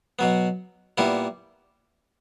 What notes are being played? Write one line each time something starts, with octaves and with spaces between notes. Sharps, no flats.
B2 F#3 B3
A#2 G3 B3 E4